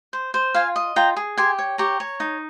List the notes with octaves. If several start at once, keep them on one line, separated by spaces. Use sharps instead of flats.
C5
C5
F4 F5 G#5
D#5
F4 G5 A#5
G#4
G4 G#5 C6
C#5
G4 A#5 C#6
C#5
D#4